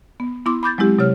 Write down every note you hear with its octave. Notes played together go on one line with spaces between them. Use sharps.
B3
B3 E4 C6 D6
B5 D6 G6 A6
F#3 G#3 C4 E4 G4
C3 F#3 G4 C#5 F6